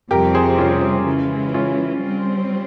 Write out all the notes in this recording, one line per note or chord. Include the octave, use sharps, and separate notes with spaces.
F2 C3 G3 C4 G4 A#4
G#4 C5
C#4 F4
C#3 E3 G#3
C#4 F4
G3 C4